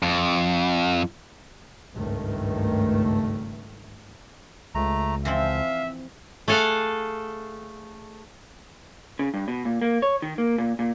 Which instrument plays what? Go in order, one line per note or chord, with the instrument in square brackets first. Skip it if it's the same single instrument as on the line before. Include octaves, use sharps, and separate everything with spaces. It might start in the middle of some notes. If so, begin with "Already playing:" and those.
[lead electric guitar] F2
[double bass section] G#1 C#2 G2 D#3 A3
[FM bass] C#2 [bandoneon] A3 A#5
[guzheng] E3 F3 C4 [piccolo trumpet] E5 [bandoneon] F5
[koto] A3 G#4 A4 F5 F#5
[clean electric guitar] C#3
G2
B2
A#2
A#3
C#5
D#3
A#3
A#2
A#2